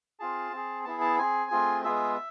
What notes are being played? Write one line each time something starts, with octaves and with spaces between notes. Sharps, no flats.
C4 F4 G#4 A5
C4 G#4
B3 E4 G#4 A5
A5
C4 G#4 G#5
A3 C4 F4 G#4
G#3 B3 F4 G#4 E5